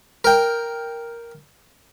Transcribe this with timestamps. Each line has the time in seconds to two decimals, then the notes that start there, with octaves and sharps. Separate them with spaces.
0.24 A#4 G5